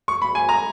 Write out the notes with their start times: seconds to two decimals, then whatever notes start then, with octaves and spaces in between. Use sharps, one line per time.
0.08 C#6
0.22 B5
0.35 G#5
0.49 A#5